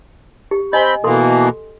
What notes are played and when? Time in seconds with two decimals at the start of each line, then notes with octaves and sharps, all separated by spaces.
0.51 G4
0.73 C4 D#5 G#5 B5 G6
1.04 B2 E3 A#3 A4 C6